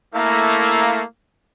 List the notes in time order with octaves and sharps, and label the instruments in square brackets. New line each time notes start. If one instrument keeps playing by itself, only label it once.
[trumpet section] A3 A#3 [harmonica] E4 F5 A#5